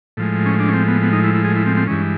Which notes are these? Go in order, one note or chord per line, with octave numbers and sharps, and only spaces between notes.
A2 F3 G#3
C#4
D4
C#4
C4
B3
B3
D#4
E4
E4
G#4
E4
C4
C4
G2 E3 G#3 C#4